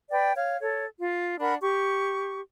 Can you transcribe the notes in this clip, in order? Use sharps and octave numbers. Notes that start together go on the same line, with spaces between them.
B4 D5 G5
C#5 F5
A4 C#5
F4
D4 A#4 F#5 B5
G4 C#6